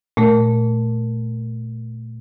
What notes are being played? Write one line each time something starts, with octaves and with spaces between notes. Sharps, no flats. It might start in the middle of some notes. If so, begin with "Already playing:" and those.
A#2 A3 A#4